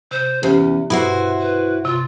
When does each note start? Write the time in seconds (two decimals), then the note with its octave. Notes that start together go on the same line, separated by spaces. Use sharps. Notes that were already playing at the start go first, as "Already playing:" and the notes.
0.11 C3 C5
0.43 E2 C#4 G4 C5
0.90 G2 B2 E4 F#4 B4 C5
1.41 B4
1.85 C3 F4